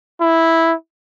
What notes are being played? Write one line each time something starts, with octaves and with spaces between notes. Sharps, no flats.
E4